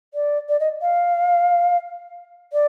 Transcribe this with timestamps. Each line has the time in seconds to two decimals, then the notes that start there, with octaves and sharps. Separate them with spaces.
0.14 D5
0.48 D5
0.59 D#5
0.81 F5
2.52 D5